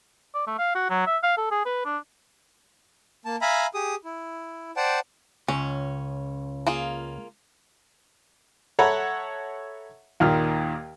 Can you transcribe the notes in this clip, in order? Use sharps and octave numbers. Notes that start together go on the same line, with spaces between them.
D5
A3
F5
F#4
F#3
E5
F5
A4
G#4
B4
D4
A#3 A5
E5 F5 G#5 A#5 B5
G4 G#4 D#6
E4
C5 D5 F#5 G5 A5
C#2 C#4
A#3 F4 G#4
A4 C#5 E5 F#5 A#5 B5
D#2 A#2 D#3 F6